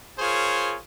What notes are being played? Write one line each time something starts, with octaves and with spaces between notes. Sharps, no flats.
F4 G#4 A#4 C5 C#5